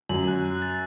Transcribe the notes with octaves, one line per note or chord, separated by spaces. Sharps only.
F#2 F#3 F#7
F#6
F#6
A6